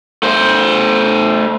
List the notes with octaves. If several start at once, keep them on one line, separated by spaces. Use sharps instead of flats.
A3 C5